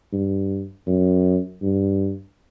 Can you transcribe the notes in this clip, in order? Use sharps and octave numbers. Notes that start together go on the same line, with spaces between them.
G2
F#2
G2